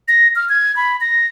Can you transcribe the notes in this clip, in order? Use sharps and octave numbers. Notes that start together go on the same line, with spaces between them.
A#6
F6
G#6
B5
A#6